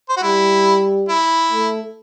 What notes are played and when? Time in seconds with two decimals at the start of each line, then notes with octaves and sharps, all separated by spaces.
0.09 C5
0.17 F#4
0.23 G3 E4
1.09 E4
1.52 A3